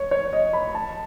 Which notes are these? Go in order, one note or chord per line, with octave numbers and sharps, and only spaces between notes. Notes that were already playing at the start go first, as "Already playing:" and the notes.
Already playing: C#5
C#5
D#5
B5
A5